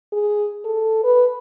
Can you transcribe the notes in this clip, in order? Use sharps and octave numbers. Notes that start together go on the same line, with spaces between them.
G#4
A4
B4